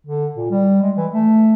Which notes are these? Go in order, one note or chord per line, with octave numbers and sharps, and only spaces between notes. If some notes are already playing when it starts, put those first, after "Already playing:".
D3
A#2
G3
G#3
E3
A3